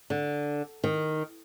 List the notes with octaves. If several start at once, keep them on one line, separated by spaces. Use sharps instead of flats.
D3
D#3